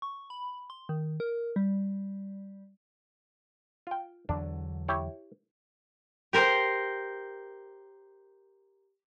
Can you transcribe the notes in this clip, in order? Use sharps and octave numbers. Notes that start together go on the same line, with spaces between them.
C#6
B5
C6
D#3
A#4
G3
F4 G5
E2 D3 F#3 D4
E4 G4 C#5
G4 A#4 C5